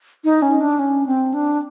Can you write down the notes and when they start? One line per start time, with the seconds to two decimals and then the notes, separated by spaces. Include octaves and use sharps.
0.24 D#4
0.42 C#4
0.60 D4
0.79 C#4
1.06 C4
1.34 D4